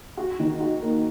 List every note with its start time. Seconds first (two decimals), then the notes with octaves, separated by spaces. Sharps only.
0.17 F#4
0.40 D#3
0.61 F#4
0.82 A#3